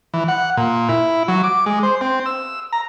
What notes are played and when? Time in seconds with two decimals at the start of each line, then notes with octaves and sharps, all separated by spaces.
0.14 E3
0.28 F#5
0.57 A#2
0.89 E4
1.28 F#3
1.44 D6
1.66 G#3
1.83 C5
2.01 C4
2.26 E6
2.73 A#5